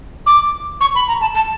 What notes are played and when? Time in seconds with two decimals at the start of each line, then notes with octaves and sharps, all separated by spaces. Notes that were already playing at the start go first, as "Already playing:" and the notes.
0.26 D6
0.81 C#6
0.95 B5
1.08 A#5
1.21 A5
1.35 A5